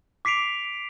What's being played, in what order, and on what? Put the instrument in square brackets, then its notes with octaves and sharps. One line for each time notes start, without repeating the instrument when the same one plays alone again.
[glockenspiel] D6 B6 C7 D7 F7